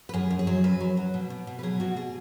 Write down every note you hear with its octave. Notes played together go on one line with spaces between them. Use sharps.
B4
F#2 G#4
F#2
G#4
F#3
F#2 B4
F#3
F#3
B2
B2
B2
B4
F#3 G#4
B2 F#4
B2 G#4